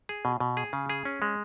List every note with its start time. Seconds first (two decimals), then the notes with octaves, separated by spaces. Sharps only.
0.09 G#4
0.25 B2
0.40 B2
0.57 G#4
0.73 C#3
0.90 G#4
1.05 C#4
1.22 G#3